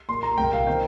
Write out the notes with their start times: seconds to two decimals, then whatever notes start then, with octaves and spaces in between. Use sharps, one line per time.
0.09 A#2 A#3 C6
0.23 A#5
0.38 C2 A#2 A#3 G5
0.53 F5
0.67 D#3 C4 G5